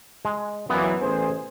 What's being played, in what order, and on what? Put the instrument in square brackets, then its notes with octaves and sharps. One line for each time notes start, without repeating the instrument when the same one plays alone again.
[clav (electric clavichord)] G#3
[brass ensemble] F#2 A#2 E3 [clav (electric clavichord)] B3
[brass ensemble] A1 G#4 C5